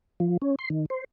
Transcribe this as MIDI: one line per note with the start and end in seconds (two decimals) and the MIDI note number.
0.20 0.37 53
0.42 0.55 61
0.59 0.69 84
0.70 0.86 51
0.90 1.04 72